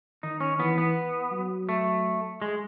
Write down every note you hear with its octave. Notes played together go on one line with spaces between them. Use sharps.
D#3 D#4
C#4
E3 B3
B3
F#3
A3
G#3